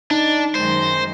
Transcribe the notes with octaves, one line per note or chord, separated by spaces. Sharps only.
D4 D#4
F#2 D#3 G#3 C5